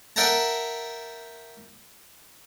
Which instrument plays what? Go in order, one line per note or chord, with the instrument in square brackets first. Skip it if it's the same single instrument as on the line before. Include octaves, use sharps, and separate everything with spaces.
[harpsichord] A#4 E5 F#5 G5 A5 A#5